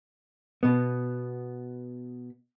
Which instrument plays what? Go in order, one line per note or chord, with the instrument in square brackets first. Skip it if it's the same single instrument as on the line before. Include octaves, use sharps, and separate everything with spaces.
[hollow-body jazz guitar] B2 B3